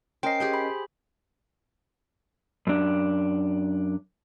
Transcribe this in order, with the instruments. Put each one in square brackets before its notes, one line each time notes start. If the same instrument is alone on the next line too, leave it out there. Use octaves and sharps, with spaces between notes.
[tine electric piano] C#4 A#4 D#5 [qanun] C5 [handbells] G5 C7
[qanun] G4 G#4 C5
[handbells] B5
[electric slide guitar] F#2 D4